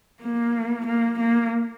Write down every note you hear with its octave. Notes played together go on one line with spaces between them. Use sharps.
A#3
A#3
A#3